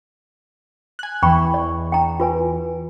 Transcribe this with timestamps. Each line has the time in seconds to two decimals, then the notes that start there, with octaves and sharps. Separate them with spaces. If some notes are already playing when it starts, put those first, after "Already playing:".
0.99 G#5 F#6
1.23 E2 E3 G5 B5 C#6
1.54 D5
1.92 G5 A#5
2.20 F4 B4 G#5